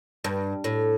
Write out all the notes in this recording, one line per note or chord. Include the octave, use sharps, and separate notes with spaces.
G2
A2